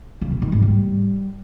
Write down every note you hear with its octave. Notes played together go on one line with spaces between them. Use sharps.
C#3
B2
D#3
G#2
G3